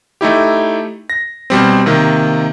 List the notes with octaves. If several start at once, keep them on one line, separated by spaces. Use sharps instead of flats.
A3 D#4 E4 G4
A#6
B2 G3 C4
C3 D#3 A#3